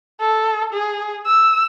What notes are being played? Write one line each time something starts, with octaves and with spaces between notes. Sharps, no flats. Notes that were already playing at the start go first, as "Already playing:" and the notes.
A4
G#4
E6